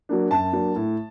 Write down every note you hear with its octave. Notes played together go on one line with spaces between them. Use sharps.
F#3 A#3 D4
F#2 A5
F#3 A#3 D4
A2